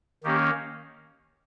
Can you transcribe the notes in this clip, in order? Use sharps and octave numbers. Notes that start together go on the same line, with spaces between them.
D#3 A#3 C#4 G4